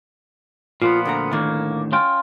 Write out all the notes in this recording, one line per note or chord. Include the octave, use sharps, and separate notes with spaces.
A#2 F3 B3 F4
D2 D3 A#5
A2 D3 D#3 A#3
C#4 F4 G5